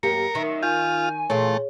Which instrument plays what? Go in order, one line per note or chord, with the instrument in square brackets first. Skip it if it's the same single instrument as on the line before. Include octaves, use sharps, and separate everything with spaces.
[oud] F#2 A#3 G4 [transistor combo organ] A#4 [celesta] C#7
[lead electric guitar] F#2 E5 [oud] D#3
[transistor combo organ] F4 [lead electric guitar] G#5 [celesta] G6
[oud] A#2 E3 F4 [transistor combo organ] A3 [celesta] G#4 C#5